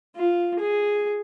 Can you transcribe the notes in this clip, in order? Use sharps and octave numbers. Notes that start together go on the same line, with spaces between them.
F4
G#4